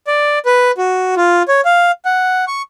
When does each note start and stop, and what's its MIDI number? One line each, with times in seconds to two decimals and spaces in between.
0.07 0.39 74
0.46 0.71 71
0.78 1.15 66
1.17 1.43 65
1.48 1.61 73
1.65 1.91 77
2.05 2.45 78
2.48 2.62 85